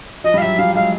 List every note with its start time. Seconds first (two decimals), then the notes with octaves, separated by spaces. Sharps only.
0.24 F3 D#5
0.34 G3
0.38 F5
0.42 F#3 E5
0.59 F3 G3 F5
0.75 F#3 G#3 F5